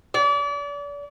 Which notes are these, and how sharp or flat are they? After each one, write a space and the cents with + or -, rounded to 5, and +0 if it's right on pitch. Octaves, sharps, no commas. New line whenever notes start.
D5 -35